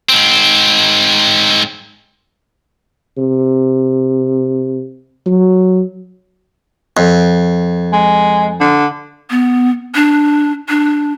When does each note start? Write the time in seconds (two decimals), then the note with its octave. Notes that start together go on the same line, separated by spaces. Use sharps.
0.09 G#2 C4
3.18 C3
5.26 F#3
6.97 F2
7.93 G#3
8.61 D3
9.30 B3
9.95 D4
10.69 D4